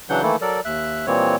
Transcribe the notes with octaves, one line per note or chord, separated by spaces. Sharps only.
C#3 E3 F#3 D4 F#5 G6
D#3 E3 A3 A#3 E4 A4
F#3 A4 A#4 D5
D#2 E5 F#6
A#2 E3 G3 A#3 C4 C#5